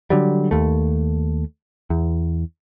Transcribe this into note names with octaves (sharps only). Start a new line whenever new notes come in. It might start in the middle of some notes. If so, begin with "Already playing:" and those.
D3 F#3 G3
D#2 A3
E2